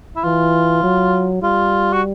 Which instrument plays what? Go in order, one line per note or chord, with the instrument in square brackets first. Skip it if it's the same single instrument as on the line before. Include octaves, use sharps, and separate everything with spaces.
[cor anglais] E4
[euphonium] E3 [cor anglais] F4
[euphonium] F#3
[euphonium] G3 [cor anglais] F4
[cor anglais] F#4